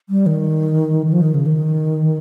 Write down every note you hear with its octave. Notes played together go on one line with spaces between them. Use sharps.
G3
D#3
D#3
F3
D#3
C#3
D#3